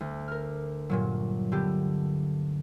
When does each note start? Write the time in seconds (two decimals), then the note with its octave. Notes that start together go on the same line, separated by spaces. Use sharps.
0.01 D2
0.28 A#4 F6
0.90 G2 A#2 F#3
1.52 D3 B3 G4